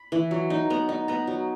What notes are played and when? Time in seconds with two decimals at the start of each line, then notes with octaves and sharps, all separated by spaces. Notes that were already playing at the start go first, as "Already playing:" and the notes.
Already playing: B5
0.12 E3
0.31 F#3
0.50 D#4
0.70 B3 A#5
0.89 D#4
1.08 B3 A#5
1.27 F#3